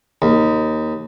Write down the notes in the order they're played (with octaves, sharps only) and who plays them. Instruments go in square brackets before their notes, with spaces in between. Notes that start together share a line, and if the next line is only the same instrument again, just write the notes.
[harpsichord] D#2